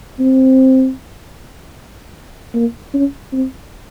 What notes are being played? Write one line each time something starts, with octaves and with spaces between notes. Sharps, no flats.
C4
A#3
C#4
C4